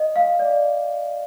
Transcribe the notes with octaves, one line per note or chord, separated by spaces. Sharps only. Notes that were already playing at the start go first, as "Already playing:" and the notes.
Already playing: D#5
F5
D5